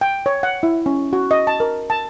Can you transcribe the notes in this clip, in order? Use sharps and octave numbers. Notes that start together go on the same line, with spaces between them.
G5
C#5
F#5
E4
C#4
F#4
D#5
A5
A#4
A5